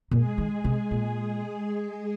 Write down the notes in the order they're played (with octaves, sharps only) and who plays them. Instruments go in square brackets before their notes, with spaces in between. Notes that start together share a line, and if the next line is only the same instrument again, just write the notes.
[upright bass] A#2 [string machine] G#3 G#4
[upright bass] D#3
C3
[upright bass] A#2 [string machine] G#3 G#4
[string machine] G#3 G#4